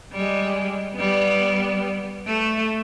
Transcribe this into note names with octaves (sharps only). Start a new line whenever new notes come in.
G3 G#3
G3 B3
A3